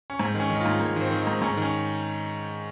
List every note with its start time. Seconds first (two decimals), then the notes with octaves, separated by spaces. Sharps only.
0.10 C#4
0.20 G#2 C4
0.35 D#3 C#4
0.50 D#3
0.55 D#4
0.60 F4
0.66 G#2
0.80 G#2 A#3
0.96 D#3 C4
1.11 D#3
1.21 D#4
1.27 G#2
1.42 G#2 C#4
1.57 D#3 C#4